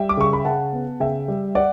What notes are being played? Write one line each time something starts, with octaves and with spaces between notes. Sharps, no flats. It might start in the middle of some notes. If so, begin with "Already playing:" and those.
Already playing: G3 E5 G5
D6
C#3 C#6
B5
C#3 F#5 A5
B3
C#3 E5 G5
G3
D5 F#5